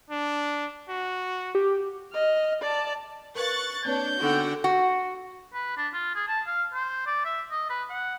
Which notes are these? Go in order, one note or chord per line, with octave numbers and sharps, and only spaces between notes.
D4
F#4
G4
D#5 F6
D5 A5
A#4 B4 F5 C#6 F#6 A6
A#3 C4 D4 B4 C#5 G6
D3 B3 D4 D#4 F#4 F#5 G5
F#4
B4
D4
F4
G#4
A5
F5
C5
D5
E5
D#5
B4
F#5